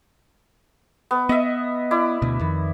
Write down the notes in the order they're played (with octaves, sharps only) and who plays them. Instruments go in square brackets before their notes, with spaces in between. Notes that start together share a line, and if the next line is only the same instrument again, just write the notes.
[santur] B3
[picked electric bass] B3 [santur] D#5 E5
[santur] E4 D5
[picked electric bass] D2 B2
F2 D#3